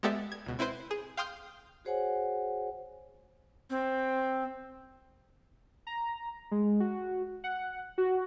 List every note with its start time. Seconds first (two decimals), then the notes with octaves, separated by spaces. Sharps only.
0.03 G#3 B3 G4 A4 D5 E5
0.32 G#6
0.46 C#2 B2
0.59 C4 E4 B4 C5
0.91 G#4
1.17 F5 G5 C6 D#6 F6 G6
1.85 F#4 G#4 C5 C#5 F#5 G#5
3.70 C4
5.87 A#5
6.51 G#3
6.80 F#4
7.44 F#5
7.98 F#4